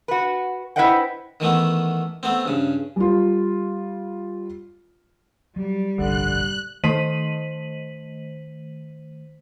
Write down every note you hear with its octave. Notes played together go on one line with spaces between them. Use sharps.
F#4 B4
E4 B4 C5 D#5 F#5 G5
D#3 E3 A3 B3
A3 B3 C4
G2 C#3
G3 F4
F#3 G3
F1 A#1 G2 D3 F#6
D#3 A3 C5 B6 D#7 F#7